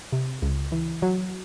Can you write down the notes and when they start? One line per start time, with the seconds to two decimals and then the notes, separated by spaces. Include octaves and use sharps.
0.12 C3
0.42 C#2
0.72 E3
1.02 F#3